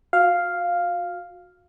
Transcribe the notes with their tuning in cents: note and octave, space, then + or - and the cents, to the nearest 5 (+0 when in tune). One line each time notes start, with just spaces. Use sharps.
F#4 -35 F5 +0